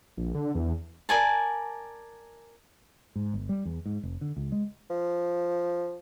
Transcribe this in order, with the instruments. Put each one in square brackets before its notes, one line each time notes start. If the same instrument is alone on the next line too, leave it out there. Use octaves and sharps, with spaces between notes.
[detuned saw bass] A#1
D3
E2
[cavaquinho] A#4 D5 G#5 A5
[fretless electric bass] G#2
G1
G3
E2
G#2
F1
D3
C#2
G#3
[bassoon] F3